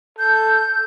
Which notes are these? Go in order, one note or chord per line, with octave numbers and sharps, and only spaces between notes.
A4 G6